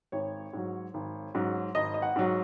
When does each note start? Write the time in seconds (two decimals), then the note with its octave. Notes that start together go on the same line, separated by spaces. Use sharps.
0.12 G#1 C#5
0.53 G#2 F#3
0.94 G#1
1.35 G#2 F#3
1.75 G#1 D#5
1.94 D#5
2.02 F#5
2.16 G#2 F#3